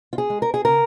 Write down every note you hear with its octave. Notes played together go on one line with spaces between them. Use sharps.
F4
G#4
G#3
A#4
G#4
C#3 A#4